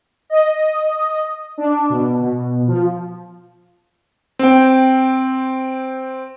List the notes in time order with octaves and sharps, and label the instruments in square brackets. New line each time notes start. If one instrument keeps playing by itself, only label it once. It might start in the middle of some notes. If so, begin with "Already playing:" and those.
[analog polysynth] D#5
D4
B2
B2
F3
[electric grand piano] C4 G5